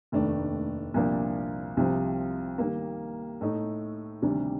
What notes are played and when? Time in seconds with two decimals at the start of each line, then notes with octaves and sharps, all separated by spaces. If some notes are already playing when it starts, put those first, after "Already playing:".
0.12 F1 D#2 D#3 A3 D4
0.94 C2 A#2 F3 A#3 D4
1.77 C2 C3 F3 C4
2.58 D#3 G3 A#3
3.41 A2 A3 D#4
4.22 D2 C3 D#3 G3 D4